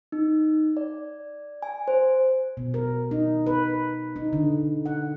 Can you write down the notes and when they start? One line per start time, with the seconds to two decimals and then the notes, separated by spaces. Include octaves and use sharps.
0.12 D#4
0.77 D5
1.62 G#5
1.88 C5
2.57 B2
2.74 A#4
3.11 D#4
3.46 B4
4.16 D#4
4.33 D3
4.86 F#5